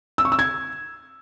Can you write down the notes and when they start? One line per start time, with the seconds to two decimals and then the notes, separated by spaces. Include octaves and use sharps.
0.18 E6
0.25 C#6
0.32 E6
0.39 G#6